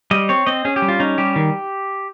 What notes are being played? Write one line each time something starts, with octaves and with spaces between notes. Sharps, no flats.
G3 D#5
C4 C#5
C4 D#5
C#4 G#4
G4
G3
F4
C#4 D#4
G3 G4
D#3